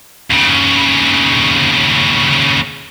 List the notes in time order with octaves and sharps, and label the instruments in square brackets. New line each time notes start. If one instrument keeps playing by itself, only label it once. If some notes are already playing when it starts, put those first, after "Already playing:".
[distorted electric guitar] D#2 C#3